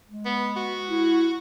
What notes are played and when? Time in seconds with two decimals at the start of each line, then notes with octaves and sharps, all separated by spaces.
0.07 G#3
0.26 B3
0.56 F#4
0.90 E4